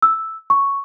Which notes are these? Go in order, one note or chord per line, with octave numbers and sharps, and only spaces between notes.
E6
C#6